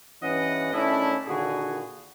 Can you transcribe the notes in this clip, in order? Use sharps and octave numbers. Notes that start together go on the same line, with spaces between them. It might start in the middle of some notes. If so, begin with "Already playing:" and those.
G2 E3 C#4 B4 D#5 F#5
D#3 A3 C#4 D4 E4
A#2 D3 D#3 F#4 G#4